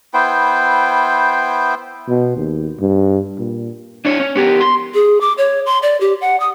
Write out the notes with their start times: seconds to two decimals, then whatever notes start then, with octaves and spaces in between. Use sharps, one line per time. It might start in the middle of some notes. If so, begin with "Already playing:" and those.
0.14 B3 E4 C5 G5
2.08 B2
2.37 D#2
2.80 G2
3.38 A#2
4.05 D4 E4 C#5
4.20 C#4
4.35 B3 G4 G#4 A#4
4.61 C6
4.94 G#4
5.21 D6
5.38 C#5
5.66 C6
5.82 D5
6.01 G4
6.21 F#5
6.40 D#6